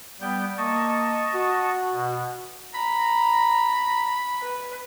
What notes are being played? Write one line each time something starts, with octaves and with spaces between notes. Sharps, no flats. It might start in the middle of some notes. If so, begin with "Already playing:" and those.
G3 B3 G5 G6
A#3 D#5 A5 C#6
F#4
B2
A#5 B5
B4